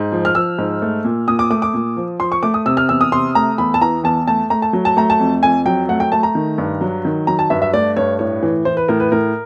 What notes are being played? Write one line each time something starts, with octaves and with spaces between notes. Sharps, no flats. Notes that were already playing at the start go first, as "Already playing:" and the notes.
Already playing: G#2
F3
F6
F3 E6
G#2
A3
A#2
A#2 D#6
D6
A3 D6
D6
A#2
F3
F3 C6
C#6
A3 D6
D#6
C3 E6
F6
E2 E6
D#6
C3 C6
A3 A#5
E2 B5
A5
E3 A#5
E2 A5
A3 A5
A3 A#5
A5
F#3
A5
A3 A#5
A5
F2
F2 G#5
F#3 G5
A3 F#5
G5
A3 A5
A#5
D#3
G2
F#3
D#3
F#3 A#5
A5
G2 E5
E5
A3 D5
G2 C#5
A2 C#5
E3
E3 C5
B4
A2 A#4
B4
A2 A#4